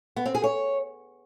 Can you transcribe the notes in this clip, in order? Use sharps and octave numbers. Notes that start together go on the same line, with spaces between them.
B3
C4
G#4
C#5